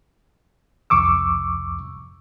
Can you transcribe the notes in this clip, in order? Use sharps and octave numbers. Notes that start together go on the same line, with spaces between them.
C2 F2 C#6 D6 E6